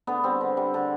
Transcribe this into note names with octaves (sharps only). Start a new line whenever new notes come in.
D3 B3
G3 C4
D3
G3
D3